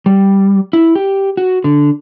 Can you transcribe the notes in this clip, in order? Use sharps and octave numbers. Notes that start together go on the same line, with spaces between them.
G3
E4
G4
F#4
D3